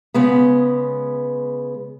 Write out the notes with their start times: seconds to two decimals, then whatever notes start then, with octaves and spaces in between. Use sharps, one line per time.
0.14 C#3 G#3 B3